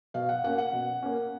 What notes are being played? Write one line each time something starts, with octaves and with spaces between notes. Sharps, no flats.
B2 F5
F#5
A#3 C#4 F#5
F#5
B2
A#3 C#4